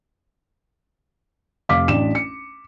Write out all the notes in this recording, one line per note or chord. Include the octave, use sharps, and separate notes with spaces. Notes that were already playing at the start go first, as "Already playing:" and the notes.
F1 F5 D6 B6
A1 D4 E7
C#7